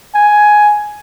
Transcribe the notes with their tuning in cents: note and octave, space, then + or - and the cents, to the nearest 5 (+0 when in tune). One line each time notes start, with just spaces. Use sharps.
G#5 +10